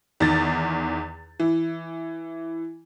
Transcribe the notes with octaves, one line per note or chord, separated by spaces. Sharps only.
E2 D#3 A6
E3